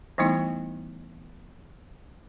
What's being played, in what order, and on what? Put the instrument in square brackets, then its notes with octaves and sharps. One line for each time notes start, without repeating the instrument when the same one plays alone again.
[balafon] E3 G3 A3 B3 D#4 E4